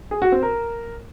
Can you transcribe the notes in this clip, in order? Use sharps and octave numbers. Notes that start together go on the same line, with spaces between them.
G#4
F#4
C4
A#4